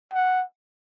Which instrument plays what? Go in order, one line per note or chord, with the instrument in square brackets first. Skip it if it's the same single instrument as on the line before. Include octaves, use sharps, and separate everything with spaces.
[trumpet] F#5